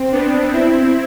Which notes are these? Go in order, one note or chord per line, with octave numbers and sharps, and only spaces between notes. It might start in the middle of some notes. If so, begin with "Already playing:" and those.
Already playing: C4
B3 D4
C4 E4